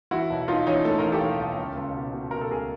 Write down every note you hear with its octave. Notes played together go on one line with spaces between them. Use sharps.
E3 E4 F#4
B1
B1 D#4 F4
E3 C#4 D#4
A2 A4
E3 A#4
G4 A4
B1
B1
C#2
C#2
B2
B2
B2 A#4
A4
C#2 G#4 A#4